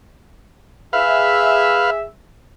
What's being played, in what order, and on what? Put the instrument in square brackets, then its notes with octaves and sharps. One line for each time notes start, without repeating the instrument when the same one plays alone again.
[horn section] G#4 E5 [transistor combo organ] B4 F5